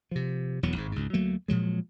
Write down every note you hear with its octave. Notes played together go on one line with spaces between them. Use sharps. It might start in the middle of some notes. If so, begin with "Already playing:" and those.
C3 F3
E1 E2 F#3 B3
G#1 G#2
C#2 G#2
D2 F#3 A3 A#3
A#2 F3 F#3 G#3